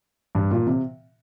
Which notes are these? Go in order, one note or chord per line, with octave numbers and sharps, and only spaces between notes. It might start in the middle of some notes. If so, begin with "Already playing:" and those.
G2
A#2
C3